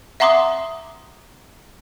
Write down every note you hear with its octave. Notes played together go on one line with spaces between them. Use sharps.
E5 F#5 A#5 C6 D6 D#6